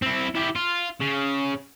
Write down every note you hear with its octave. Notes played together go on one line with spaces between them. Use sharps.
C4 E4
E4 G4
F4
C#3